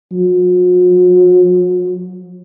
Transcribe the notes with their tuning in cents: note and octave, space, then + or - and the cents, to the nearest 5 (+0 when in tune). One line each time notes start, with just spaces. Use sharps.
F#3 -45